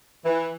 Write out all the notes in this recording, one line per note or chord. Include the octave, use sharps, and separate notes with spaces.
E3